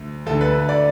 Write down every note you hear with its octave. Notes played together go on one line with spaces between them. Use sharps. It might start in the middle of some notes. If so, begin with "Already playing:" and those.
Already playing: D2
D2 D3 A4
B4
D5